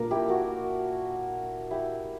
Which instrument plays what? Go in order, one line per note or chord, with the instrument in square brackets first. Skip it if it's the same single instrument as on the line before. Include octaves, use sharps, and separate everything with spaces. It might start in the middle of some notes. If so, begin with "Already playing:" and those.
Already playing: [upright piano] A#2 A#3 [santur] D4 A#4
[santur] E4 G4
F#4 A#4
E4 G4